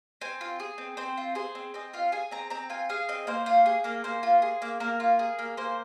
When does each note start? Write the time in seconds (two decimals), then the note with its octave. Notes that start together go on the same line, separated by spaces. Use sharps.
0.21 C4 G#5
0.41 F4
0.60 G#4
0.78 C4
0.97 C4 C5
1.17 F4
1.35 G#4 C5
1.55 C4
1.74 C4 D#5
1.94 F4 F5
2.12 G#4 G#5
2.31 C4 A#5
2.50 C4 A#5
2.70 F4 G#5
2.89 G#4 F5
3.09 C4 D#5
3.27 A#3 C5
3.46 F4 C5
3.66 G#4
3.84 A#3 A#4
4.04 A#3 C5
4.23 F4
4.42 G#4
4.62 A#3
4.80 A#3 A#4
5.00 F4
5.19 G#4
5.39 A#3
5.57 A#3 C5